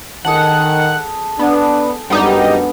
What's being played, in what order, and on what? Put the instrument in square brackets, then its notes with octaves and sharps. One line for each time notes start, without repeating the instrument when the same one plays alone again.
[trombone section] D#3 [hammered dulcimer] G#4 A4 A5 [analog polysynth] F#5
[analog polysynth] B3 [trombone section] D4
[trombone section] F#2 [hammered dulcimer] D3 G#3 B3 [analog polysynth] G3 D#4 G4